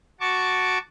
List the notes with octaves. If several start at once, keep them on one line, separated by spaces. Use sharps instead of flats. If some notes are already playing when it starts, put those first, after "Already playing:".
F#4 A5 C#6 D6